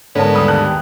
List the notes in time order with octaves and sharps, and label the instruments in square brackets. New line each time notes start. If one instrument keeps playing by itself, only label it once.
[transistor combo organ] G#2 B3 [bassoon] D3 [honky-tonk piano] C#4 A#4 A5
[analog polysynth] D#2 G3 [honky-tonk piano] B5 D#6
[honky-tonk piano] E2 A5 F#6 [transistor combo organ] G#2